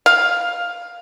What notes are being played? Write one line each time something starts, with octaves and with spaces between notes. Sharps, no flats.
F5